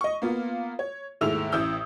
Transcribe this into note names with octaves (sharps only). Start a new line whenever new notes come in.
D#5 C#6
A#3 B3 F4
C#5
D#2 G#2 A3 E4 E6 F7
A1 E4 D#6 E6 G6